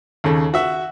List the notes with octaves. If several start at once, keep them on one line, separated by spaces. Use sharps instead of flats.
D#2 C#3 A4
F#4 E5